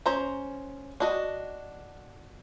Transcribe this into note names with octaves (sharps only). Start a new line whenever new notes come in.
C#4 C5 A#5
D4 F#4 D#5